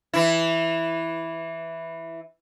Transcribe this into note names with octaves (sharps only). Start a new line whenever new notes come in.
E3 E4